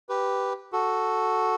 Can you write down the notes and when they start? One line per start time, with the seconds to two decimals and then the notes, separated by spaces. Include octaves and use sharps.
0.09 G4 B4
0.73 F#4 A4